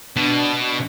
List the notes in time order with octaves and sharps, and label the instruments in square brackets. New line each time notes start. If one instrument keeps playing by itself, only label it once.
[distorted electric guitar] B2 [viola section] D4